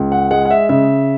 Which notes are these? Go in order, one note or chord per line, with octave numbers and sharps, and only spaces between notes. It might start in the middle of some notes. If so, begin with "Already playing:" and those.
Already playing: C#2
F#5
G#3 F#5
F#5
E5
C#3 E5